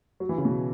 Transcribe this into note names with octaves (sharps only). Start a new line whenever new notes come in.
F#3
E3
C#3
B2